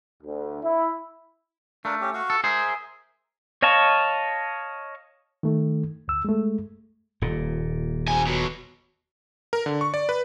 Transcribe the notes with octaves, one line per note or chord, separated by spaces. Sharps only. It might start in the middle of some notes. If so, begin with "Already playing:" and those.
D2
E4
A3 D4 A#4 F5
C#4 G4
F#4 F5 C#6
A4
G#4 A#4 C5 E5
C#5 D#5 F5 A5 C#6
D#3 A3
D2 E6
G#3 A3
D#1 A#2
C3 G#5
B2 F#3
A#4
D3
C#6
D5
B4